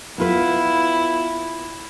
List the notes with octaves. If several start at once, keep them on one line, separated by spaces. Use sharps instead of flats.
B3 E4 F4 B4